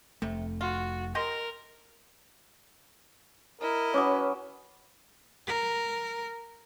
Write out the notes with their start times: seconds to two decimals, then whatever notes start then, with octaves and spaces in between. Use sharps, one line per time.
0.22 F1 C3 A3
0.61 F4 F#4
1.15 G4 A#4 D#5 C6
3.61 E4 A#4 D#5
3.94 F#3 C#4 B4 C#5 D6 D#6
5.47 A#4